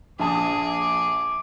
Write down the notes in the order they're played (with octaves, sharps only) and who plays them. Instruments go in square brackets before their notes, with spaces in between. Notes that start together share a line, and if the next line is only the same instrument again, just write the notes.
[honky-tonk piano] A#1 A5 D#6 [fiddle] G#4 [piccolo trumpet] D6